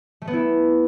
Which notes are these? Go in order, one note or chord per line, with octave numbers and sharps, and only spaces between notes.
A3
B3
E4